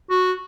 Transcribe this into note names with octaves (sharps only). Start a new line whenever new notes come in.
F#4